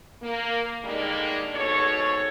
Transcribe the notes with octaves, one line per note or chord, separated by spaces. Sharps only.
A#3
D3 D#3 G3 G#3 A#3 D4
G#2 B2 A4 C#5